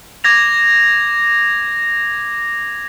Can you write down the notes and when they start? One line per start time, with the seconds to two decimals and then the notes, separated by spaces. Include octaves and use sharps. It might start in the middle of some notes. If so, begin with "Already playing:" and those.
0.24 D6 G#6 A#6 F7